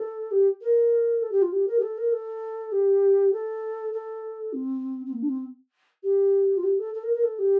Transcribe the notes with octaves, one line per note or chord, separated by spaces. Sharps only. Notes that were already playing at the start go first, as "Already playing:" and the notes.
Already playing: A4
G4
A#4
A4
G4
F4
G4
A#4
G4
A4
A#4
A4
G4
A4
A4
C4
C4
A#3
D4
C4
G4
F4
G4
A4
A4
A#4
A#4
A4
G4